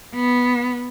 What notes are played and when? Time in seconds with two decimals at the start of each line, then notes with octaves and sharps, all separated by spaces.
0.15 B3